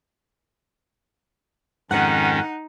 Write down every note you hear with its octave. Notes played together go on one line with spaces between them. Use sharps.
F2 G#2 D#3 C#4 D#4 F#5